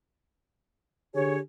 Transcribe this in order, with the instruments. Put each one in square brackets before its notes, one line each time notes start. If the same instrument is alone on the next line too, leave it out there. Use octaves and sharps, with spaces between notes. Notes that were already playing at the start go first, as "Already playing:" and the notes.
[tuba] D3 [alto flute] G4 [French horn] G#4 [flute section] C#5